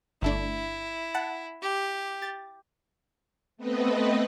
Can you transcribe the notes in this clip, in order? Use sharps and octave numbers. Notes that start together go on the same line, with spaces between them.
G1 A3 D4 E4
F#5 A5
G4
A6
A3 B3 C4 B4 D#5